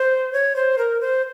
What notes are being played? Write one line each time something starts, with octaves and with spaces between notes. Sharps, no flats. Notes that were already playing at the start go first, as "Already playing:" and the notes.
Already playing: C5
C#5
C5
A#4
C5